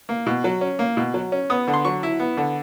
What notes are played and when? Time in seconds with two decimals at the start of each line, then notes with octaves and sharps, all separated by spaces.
0.09 A#3
0.26 B2
0.44 F#3
0.61 C#4
0.79 A#3
0.97 B2
1.14 F#3
1.32 C#4
1.50 B3 D#6
1.68 D3
1.74 C6
1.85 F#3 C#6
2.03 E4
2.20 B3
2.37 D3